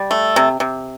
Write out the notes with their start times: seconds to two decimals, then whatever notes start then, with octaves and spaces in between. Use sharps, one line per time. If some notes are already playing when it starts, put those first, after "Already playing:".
Already playing: G3
0.11 A3
0.36 C3
0.60 C3